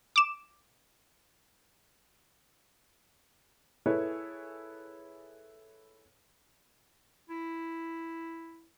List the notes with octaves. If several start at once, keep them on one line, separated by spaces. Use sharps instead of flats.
D6 E7
E4 G#4 A4 B4 C#5
E4